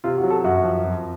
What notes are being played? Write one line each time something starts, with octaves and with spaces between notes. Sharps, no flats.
C3 F4
F#4
F#3
A4
F#2 F#4
F3
F2